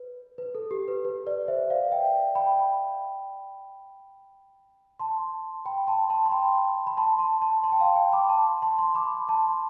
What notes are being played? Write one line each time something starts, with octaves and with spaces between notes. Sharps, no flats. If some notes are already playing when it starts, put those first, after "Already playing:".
Already playing: B4
B4
A4
G4
B4
B4
B4 D5
C5 E5
D5 F5
E5 G5
G5 B5
A5 C6
G5 B5
A5 C6
A5 C6
C6
G5 B5
B5
A5 C6
A5 C6
A5 C6
A5 C6
G5
F5 A5
G5 B5
B5 D6
A5 C6
A5 C6
A5 C6
B5 D6
A5 C6